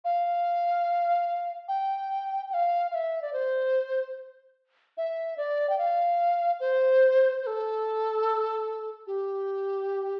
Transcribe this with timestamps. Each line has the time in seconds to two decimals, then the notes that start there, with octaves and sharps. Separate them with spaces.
0.05 F5
1.68 G5
2.50 G5
2.54 F5
2.91 F5
2.95 E5
3.22 D5
3.33 C5
4.97 E5
5.37 D5
5.70 G5
5.78 F5
6.60 C5
7.42 C5
7.47 A4
9.07 G4